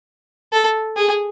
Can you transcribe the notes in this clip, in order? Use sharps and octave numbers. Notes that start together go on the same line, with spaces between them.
A4
G#4